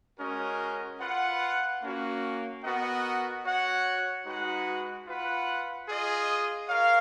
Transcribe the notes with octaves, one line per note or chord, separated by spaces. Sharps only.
G#3 C#4 F#4 A#4 D#5
F4 B4 F#5
A#3 C#4 F#4
B3 F#4 A#4 D#5 F#5
F#4 C#5 F#5
G#3 D#4 F#4 B4 F#5
F4 B4 F#5
F4 G#4 D#5
A#4 C#5 F5